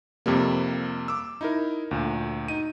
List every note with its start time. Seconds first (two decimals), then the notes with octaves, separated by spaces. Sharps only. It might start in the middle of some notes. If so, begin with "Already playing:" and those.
0.26 F2 C3 G3 A#3
1.08 D6 E6
1.41 D#4 E4 A#4
1.91 D2 A#2
2.48 D#4 D#7